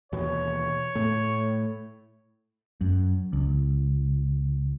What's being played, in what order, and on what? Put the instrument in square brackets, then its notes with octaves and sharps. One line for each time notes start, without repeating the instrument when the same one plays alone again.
[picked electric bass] D#2 B2 E3 [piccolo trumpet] C#5
[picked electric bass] A2 A3
[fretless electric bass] F#2
C#2